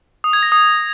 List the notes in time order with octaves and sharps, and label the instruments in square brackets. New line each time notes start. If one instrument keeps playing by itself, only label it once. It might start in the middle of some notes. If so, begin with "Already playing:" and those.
[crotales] D#6
G#6
A#6
D#6